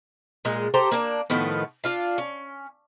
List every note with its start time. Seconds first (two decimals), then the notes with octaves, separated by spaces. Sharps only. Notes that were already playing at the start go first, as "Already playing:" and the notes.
0.45 A#2 G#3
0.74 G4 A4 C5 A#5
0.92 A#3 D4
1.30 A2 D#3 F3 B3
1.84 D4 F4 F5
2.18 C#4